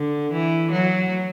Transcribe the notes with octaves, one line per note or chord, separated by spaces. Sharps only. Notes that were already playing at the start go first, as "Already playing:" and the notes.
Already playing: D3
E3
F#3